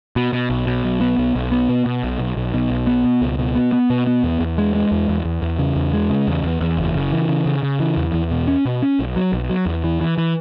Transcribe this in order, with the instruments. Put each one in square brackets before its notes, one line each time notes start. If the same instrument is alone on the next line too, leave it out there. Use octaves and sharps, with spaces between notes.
[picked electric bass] B2
B2
B1
B2
B1
B3
B1
B1
B3
B2
B2
B1
B1
B1
B2
B1
B3
B2
C#2
B2
B3
B3
B2
B3
E2
E2
G#3
G#3
E2
E2
E2
E2
C#3
E2
G#3
C#3
E2
E2
E2
F#1
C#3
E3
C#3
C#3
C#3
E3
E2
E2
B2
C#4
B2
C#4
B1
F#3
B1
F#3
E2
E3
E3
E3